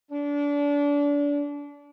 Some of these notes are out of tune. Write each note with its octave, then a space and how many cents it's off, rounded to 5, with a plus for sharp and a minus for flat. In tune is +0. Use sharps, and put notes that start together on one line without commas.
D4 -30